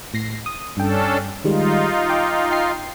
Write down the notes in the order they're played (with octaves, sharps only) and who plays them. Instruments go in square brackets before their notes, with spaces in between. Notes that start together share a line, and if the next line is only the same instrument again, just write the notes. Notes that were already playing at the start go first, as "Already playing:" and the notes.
[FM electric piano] A2 A#6 C7
D#6
[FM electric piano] G2 G5 [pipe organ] C#4 D4 A4
[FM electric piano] D#3 G3 G#3 [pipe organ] D#4 F4
[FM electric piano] G5 D6
G5 C7